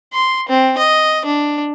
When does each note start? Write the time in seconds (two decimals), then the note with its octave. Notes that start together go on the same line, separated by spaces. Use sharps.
0.13 C6
0.49 C4
0.78 D#5
1.25 D4